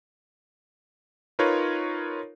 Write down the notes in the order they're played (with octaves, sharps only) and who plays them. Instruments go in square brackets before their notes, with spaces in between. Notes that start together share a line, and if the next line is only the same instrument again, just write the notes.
[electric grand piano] D#4 F4 A#4 B4 C#5